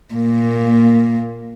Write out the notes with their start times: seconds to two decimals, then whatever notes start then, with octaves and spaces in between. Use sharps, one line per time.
0.14 A#2 A#3